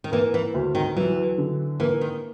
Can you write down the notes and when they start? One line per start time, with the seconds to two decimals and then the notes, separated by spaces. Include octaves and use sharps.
0.04 D#3
0.12 E3 A#3
0.34 E3
0.54 D2
0.75 D#3
0.96 E3 F#3
1.38 D3
1.80 E3 A#3
2.01 D#3